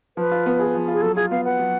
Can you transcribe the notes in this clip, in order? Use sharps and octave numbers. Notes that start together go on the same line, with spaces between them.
F3 B4
F4
B3
G#4
F3
F4
G#4
F#3 A4
F4 G#4
B3 F5
B4 F#5
F#3